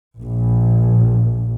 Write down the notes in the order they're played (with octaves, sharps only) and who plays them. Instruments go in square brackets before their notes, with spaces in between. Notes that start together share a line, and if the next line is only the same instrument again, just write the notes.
[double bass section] A#1